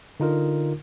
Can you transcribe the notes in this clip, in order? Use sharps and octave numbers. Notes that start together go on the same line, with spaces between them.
D3 D#4 F4 A#4